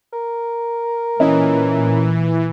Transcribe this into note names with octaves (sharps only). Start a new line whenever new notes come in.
A#4
A#2 E3 C#4 D#5